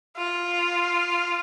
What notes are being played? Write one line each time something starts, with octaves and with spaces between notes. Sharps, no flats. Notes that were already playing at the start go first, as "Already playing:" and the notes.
F4